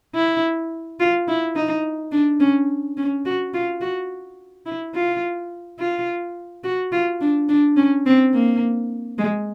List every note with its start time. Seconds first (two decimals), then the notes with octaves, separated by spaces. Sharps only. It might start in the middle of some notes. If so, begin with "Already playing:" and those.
0.15 E4
1.00 F4
1.28 E4
1.56 D#4
2.12 D4
2.40 C#4
2.97 C#4
3.25 F#4
3.54 F4
3.81 F#4
4.66 E4
4.95 F4
5.79 F4
6.64 F#4
6.92 F4
7.21 D4
7.49 D4
7.77 C#4
8.06 C4
8.34 A#3
9.18 G#3